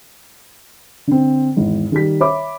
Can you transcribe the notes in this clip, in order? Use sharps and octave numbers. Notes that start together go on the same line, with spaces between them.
D3 C4
G#1 E2
D#3 G3 B6
C#5 E5 B5 D6